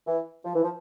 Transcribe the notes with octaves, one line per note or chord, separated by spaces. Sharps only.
E3
F3
E3
F3